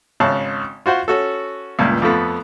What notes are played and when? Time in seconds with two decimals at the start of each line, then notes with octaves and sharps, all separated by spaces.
0.20 G#1 C#3 A5
0.86 F4 F#4 C5 F#5
1.08 C#4 F#4 A4
1.79 C#2 G2 A#2
2.02 F2 F3 A3 B3